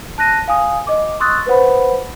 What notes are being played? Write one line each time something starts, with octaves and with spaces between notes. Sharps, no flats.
A5 F#6 A#6 D#7
F5 G#5 D#6
D#5 D6
C6 C#6 D#6 E6 F#6 A6
B4 C5 F#5 B5